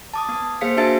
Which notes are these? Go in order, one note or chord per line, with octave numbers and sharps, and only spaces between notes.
A5 D6 D#6
B3
A#3 G#4 C5 F5 B6 C#7
D4 F#4 E5 A5 A6 D7